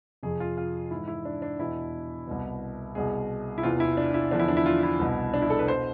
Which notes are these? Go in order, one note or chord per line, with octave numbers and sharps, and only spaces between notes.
F2 C3 F3 G#4
F4
F4
G#2 E3 E4
E4
D4
D4
E2 B2 E4
C2 B2
C2 B2 G#4
E4
E2 C3 E3 F4
E4
D4
E4
E2 D3 F3 D4
E4
D4
E4
F4
E4
C2 B2
D4
E4
A4
B4
B2 C5